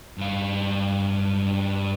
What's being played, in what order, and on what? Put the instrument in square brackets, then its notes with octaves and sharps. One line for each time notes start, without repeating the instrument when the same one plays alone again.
[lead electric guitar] G2 F5